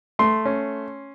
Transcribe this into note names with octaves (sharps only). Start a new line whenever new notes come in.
A3 C6
C#4